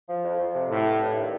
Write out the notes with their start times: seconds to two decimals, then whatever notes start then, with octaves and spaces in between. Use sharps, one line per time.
0.09 F3
0.24 F2
0.39 F2
0.55 C3
0.69 A2 A3
0.85 G2
1.00 G2
1.16 D#3